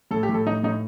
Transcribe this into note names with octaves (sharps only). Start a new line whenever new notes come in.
A2 A4
G4
A2
A4
A2 D#4
A2 D#4